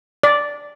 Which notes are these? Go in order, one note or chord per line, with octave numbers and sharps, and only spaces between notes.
D5